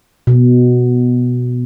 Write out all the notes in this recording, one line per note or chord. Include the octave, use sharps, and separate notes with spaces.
B2